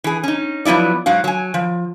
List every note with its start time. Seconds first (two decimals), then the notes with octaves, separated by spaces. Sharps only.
0.04 E3 G#4
0.23 C#4 D#4
0.65 F3 F#3 B3 E4 D5
1.06 G#2 F#3 F#4 F5
1.24 F#3 G#5
1.54 F3